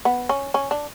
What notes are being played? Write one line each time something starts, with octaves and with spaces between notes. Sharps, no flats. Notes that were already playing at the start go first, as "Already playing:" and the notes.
B3
C#4
C#4
D4